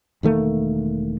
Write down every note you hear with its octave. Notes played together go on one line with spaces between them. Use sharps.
E1 D#3 A3 A#3